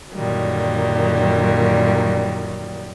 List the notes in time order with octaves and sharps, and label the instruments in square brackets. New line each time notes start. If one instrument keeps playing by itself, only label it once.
[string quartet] F#2 A#2 D3 D#3 F#3 G3